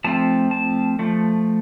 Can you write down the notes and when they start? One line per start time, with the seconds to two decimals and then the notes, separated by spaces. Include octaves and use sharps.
0.04 F3 A3 C4 A5
0.51 A5
0.99 F3 A3